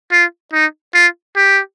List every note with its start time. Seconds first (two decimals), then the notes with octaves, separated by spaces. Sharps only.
0.12 F4
0.53 D#4
0.94 F4
1.36 G4